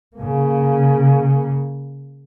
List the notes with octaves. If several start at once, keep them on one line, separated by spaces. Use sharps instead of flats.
C#3 A#3